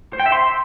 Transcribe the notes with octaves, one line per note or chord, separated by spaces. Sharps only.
C5
G5
E5
C6